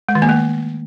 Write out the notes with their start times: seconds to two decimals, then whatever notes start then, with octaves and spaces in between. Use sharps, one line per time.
0.09 G#3
0.15 D#3
0.22 A#3
0.29 A3